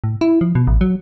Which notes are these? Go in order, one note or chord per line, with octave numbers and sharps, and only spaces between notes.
A2
E4
F3
B2
A1
F#3